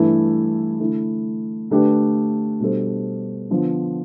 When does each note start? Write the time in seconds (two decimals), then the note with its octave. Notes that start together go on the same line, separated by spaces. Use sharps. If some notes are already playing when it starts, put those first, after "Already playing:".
Already playing: G2 E3 A3 E4
0.80 D3 A3 E4
1.70 D3 A3 D4 G4 B4
2.60 B2 G3 D4 A4 C5
3.50 D3 F3 B3